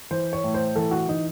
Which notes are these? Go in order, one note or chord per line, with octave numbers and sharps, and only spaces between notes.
E3 C5
C#5
A2
C5
E3 A4
F#4
E3 D#4